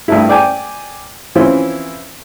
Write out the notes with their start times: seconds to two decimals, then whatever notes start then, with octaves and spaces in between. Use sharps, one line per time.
0.08 G2 A3 E4
0.29 D5 G5 G#5
1.35 E3 F3 C4 C#4 E4 F4